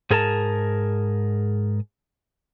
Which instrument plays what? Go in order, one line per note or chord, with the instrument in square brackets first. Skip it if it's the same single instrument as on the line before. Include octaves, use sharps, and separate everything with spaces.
[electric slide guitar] G#2 G#4 A#4 G#5 A5